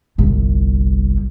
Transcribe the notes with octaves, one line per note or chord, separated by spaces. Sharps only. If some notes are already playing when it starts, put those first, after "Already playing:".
G1 C2